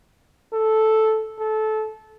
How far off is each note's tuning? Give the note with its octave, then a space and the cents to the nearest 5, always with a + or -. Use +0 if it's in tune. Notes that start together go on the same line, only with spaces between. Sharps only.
A4 -5
A4 -20